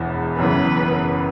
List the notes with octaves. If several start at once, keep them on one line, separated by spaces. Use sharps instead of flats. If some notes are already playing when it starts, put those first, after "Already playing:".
Already playing: E1 E2 E3 B3
F#1 F#2 E3 B3 B4